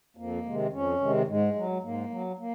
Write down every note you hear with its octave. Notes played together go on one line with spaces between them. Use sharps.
F2 A#3
C3 D#3 G#3
F2 C#4
C3 D#3 G#3
G#2 G#3
F#3
G#2 A#3
F#3
A#3